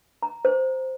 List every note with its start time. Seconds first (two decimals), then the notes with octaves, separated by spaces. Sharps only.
0.23 A#5
0.45 C5